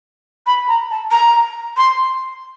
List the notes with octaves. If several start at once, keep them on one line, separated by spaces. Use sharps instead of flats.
B5
A#5
A5
A#5
C6